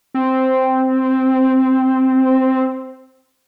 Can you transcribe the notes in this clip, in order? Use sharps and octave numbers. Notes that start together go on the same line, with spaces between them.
C4